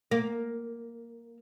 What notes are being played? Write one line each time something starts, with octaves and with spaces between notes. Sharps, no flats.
A#3